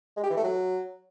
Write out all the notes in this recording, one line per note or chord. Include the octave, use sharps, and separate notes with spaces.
G#3
G4
E3
A3
F#3